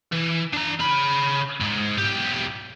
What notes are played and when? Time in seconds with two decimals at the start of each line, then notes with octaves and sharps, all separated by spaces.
0.12 E3
0.53 D4 A#5
0.80 C#3 B5
1.61 G#2
1.98 B1 G4